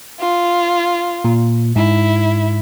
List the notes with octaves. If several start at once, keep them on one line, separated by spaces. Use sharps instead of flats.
F4
A#2
G#2 E4